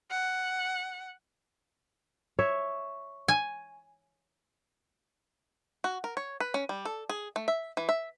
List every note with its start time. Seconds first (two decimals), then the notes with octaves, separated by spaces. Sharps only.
0.11 F#5
2.39 C#5 E5
3.28 G#5
5.84 F#4
6.04 A#4
6.17 C#5
6.40 B4
6.54 C#4
6.69 G3
6.85 A4
7.09 G#4
7.36 A3
7.48 E5
7.77 E3
7.89 E5